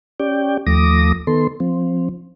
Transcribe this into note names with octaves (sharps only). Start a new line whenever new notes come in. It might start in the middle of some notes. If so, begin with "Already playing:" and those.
C#4 G4 D5 G5
D#2 F3 A3 D6 D#6 A#6
D#3 B3 A4 C6
F3 C4